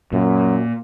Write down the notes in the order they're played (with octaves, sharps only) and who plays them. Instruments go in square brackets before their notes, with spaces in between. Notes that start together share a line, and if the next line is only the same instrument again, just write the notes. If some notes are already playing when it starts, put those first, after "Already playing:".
[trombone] F#2 [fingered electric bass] A#2